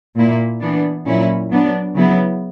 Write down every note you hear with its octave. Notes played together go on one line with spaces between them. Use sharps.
A#2 A#3 E4
E3 B3 D4
A#2 F#3 C#4 E4
F#3 B3 D4
C#3 F#3 B3 E4